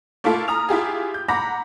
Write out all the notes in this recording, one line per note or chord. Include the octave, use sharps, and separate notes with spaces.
A3 A#3 E4 F4 A4
A#5 D#6 F6 F7
E4 F4 G4 G#4
G6
F#5 A#5 B5 D6 A#6